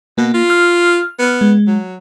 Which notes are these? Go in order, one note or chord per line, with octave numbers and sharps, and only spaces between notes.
B2 A#3
F4
F6
B3
G#3
F#3